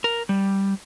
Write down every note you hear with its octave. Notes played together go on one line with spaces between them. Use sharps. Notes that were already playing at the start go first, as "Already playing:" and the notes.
A#4
G3